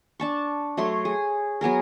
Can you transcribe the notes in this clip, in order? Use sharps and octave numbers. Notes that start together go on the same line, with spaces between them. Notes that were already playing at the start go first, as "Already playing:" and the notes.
D4 A5 C#6
F#3 A3 C#5 C6
G#4
F#3 B3 G#4 A#4